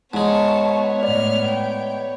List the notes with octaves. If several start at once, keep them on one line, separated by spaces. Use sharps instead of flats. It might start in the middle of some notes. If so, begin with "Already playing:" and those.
G#2 G#3 B3 C#5 A5 C#6
A2 D5 F6
G5